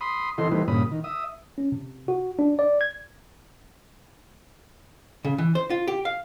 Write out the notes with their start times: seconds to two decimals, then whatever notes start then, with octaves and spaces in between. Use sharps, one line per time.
0.01 B5 C6 D#6
0.38 C3 E3 E4 A4 D#5 C6
0.52 E3 G3 A3 D#4 B4 C5
0.68 G2 A#2 C#3 B5 D#6
0.91 D#3
1.04 E5 D#6
1.58 C#4
1.72 C3
2.08 F#4
2.39 D4
2.59 D5
2.81 G#6
5.25 C#3
5.38 E3
5.55 C5
5.70 F4
5.88 G4
6.05 F5